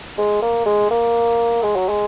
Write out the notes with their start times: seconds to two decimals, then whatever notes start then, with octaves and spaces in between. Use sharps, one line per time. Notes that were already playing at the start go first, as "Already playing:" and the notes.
0.18 G#3
0.42 A#3
0.66 G#3
0.90 A#3
1.62 G#3
1.76 F#3
1.89 G#3